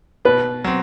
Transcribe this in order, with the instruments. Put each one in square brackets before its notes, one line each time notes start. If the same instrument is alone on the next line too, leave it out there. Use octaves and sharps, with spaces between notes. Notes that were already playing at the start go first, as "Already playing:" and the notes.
[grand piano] B2 [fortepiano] B4
[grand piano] F#3 C4